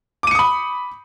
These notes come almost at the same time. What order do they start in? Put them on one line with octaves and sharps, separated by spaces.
D6 D#7 C#7 D#6 B5